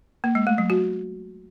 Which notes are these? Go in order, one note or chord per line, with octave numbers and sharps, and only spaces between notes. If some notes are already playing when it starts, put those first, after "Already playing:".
A#3
G#3
A3
F#3
F#4